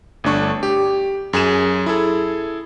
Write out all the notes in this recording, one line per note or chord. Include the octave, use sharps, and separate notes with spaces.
G1 A3 D4 C#6
G4
F#2 G#4 G#5 E7
E4 G#4 A4